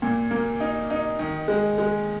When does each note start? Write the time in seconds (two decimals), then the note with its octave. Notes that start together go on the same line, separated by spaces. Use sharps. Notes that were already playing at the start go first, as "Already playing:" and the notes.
0.02 A#2
0.31 A#3
0.60 D#4
0.90 D#4
1.19 D#3
1.48 G#3
1.78 G#3